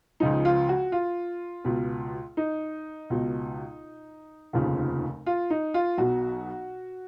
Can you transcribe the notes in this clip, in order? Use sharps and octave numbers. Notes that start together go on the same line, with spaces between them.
C#2 C#3 F3 D#4
F4
F#4
F4
C#2 B2
D#4
C#2 B2
F1 D#2 C#3 F3
F4
D#4
F4
B1 B2 F#4